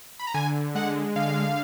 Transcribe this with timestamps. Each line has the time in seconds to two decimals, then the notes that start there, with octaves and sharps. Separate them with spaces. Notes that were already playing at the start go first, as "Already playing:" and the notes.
0.19 B5
0.27 A#5
0.34 D3 G#5
0.75 G#3 F#5
1.16 D3 F5